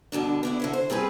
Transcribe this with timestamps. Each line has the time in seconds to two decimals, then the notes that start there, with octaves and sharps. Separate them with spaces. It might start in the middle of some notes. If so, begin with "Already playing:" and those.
0.12 G2 B2 D3 D4
0.43 B3 D4 E4
0.60 D3 E4 C#5
0.73 C5
0.90 G3 C4 G#4 B4